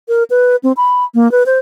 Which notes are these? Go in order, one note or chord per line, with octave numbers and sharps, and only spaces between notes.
A#4
B4
C4
B5
A#3
B4
C5